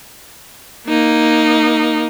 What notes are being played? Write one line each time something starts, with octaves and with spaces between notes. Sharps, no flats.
A#3 D#4